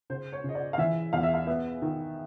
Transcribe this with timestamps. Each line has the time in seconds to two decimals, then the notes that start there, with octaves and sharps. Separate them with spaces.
0.10 C#3 C5
0.32 C#5
0.44 C#3 D#5
0.55 D5
0.73 F5
0.78 E3 E5
1.13 E2 F5
1.23 E5
1.34 F5
1.47 B3 E5
1.82 D#3